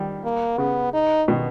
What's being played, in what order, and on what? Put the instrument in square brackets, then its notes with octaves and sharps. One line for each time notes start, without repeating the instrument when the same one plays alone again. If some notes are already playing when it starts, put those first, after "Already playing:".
Already playing: [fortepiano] D#3 G3
[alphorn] A#3
[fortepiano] C#3 [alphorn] B3
[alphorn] D#4
[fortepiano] B2 D#3